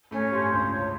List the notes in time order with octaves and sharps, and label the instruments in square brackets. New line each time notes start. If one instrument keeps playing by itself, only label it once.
[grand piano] A2 A3 [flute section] C#4
[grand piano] G2 G3 [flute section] C5
[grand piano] C#2 C#3 [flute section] C5
[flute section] C#5